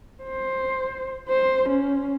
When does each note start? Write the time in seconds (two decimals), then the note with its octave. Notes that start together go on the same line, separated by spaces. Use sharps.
0.23 C5
1.29 C5
1.69 C#4